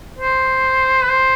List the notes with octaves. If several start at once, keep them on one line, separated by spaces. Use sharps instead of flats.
C5
B4
C5